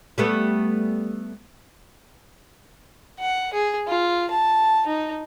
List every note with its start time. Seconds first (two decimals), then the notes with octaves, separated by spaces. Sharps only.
0.18 G3 A3 B3
3.19 F#5
3.53 G#4
3.87 F4
4.30 A5
4.86 D#4